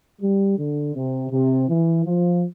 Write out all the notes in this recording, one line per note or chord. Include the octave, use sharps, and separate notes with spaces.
G3
D3
C3
C3
E3
F3